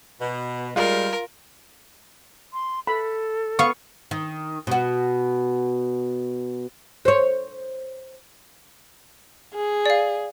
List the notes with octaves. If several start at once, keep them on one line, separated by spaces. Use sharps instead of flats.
B2
G3 G#3 F4 A#4
C6
A4 B5
B3 F5 C#6
D#3
B2 F#4
C5 C#5
G#4
D5 F5